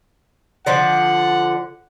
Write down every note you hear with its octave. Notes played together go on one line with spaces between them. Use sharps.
D3 F3 D5 F#5